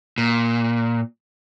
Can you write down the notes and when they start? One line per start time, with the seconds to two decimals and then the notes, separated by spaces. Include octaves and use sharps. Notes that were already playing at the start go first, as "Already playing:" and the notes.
0.18 A#2